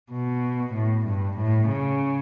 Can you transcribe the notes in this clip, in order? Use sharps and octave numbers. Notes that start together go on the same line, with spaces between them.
B2
A2
G2
A2
C#3